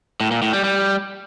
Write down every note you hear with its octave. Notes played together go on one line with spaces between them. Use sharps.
A2
A#2
A2
G3
G3